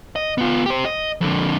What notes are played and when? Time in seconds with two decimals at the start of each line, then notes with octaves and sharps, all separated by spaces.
0.16 D#5
0.38 B3 F4
0.66 G4 C5
0.85 D#5
1.21 F2 D3